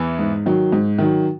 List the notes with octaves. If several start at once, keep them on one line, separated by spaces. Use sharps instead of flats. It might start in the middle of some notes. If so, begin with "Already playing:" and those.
Already playing: E2 E3
G#2
D#3 F#3
G#2
D#3 F#3